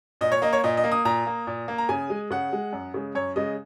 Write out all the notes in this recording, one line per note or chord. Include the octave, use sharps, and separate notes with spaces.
A#2 D#5
C#5
A#3 D#5
C#5
A#2 D#5
D#5
A#3
D#6
A#2 A#5
A#3
A#2
A#3
A#5
C#3 G#5
G#3
C#3 F#5
G#3
F#2
C#3 G#3
F#2 C#5
C#3 G#3 D#5